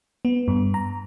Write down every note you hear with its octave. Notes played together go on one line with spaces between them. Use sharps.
B3
G2
A#5